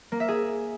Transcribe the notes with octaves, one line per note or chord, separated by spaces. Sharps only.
A#3
E5
G#4